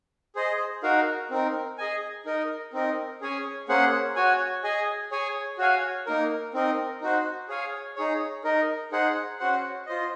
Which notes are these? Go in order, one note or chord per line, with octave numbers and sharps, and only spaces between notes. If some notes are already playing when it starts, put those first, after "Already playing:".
G#4 C5 D#5
D#4 F#4 A#4 F5
C4 D#4 A#4
G#4 D#5 G#5
D#4 A#4 D#5
C4 D#4 A#4 D#5
C#4 G#4 C#5 G#5
A#3 C#4 G#4 C5 F#5
F#4 C#5 G#5
G#4 D#5 G#5
G#4 C#5 G#5
F#4 C#5 F5 G#5
A#3 D#4 A#4
C4 D#4 A#4 D#5
D#4 F#4 C5
G#4 C#5 F5 G#5
D#4 G#4 C#5
D#4 A#4 D#5
D#4 G#4 C5 F#5
C#4 F#4 C5 F#5
F4 C5 D#5